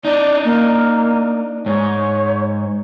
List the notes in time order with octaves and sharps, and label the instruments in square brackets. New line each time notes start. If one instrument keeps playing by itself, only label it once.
[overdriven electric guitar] D4 D#4 [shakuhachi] D5
[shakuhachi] A#3
[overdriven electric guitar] G#2 [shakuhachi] C#5